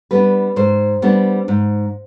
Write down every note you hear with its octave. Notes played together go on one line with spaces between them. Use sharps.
G3 B3 D4 B4
G#2 C5
G3 B3 D4
G#2